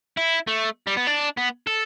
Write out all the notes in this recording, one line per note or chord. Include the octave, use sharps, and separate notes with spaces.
E4
A3
G3
B3
D4
B3
A4